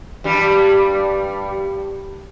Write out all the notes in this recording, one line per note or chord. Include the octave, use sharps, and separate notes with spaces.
G2 G3